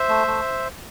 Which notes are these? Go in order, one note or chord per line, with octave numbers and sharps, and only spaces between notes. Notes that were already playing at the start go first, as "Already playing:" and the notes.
Already playing: C5 E5
A3
A3